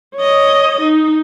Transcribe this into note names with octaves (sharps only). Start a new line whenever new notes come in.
C#5 D#5
D#4